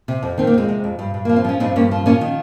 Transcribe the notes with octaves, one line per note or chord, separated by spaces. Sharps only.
C3
F2
D#3 C4
A#3
F2 G#3 C4
C3
F2
G2
G2
F3 A#3
C4
F3 C#4
G2 C4 D#4
G2 A#3 C#4
F3
F3 A#3 C#4
D#3